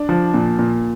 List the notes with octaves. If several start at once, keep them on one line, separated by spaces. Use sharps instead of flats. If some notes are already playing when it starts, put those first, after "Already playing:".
Already playing: D4
F3
A#2
A#2